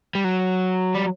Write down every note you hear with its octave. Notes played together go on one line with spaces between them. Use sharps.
G3
F#3
G3